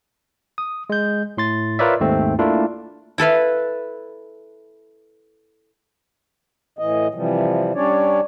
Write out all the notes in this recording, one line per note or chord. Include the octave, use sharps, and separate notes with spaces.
D#6
G#3 G6
A2 C6 A6
F4 A#4 B4 C#5 D5 E5
D#2 G#2 A3 C4
A3 A#3 D4 E4 F4
E4 A4 B4 F5
A2 E3 D#5
C3 E3 F3 G3
G3 C#4 D4 C#5 D5